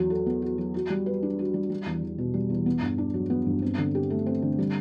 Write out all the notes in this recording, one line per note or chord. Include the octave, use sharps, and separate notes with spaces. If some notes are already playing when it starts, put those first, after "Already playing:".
Already playing: E2 F#3 F#4
A4
B3
F#4
F#3
F#4
G3
B4
D4
F#4
G3
G3
E2
E2
B2
G3
E2
B3
G2
D4
F#3
B3
G2
C4
D3
G4
A3
C4
D3
G3